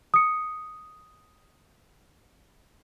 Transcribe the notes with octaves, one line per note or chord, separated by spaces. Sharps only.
D#6 C#7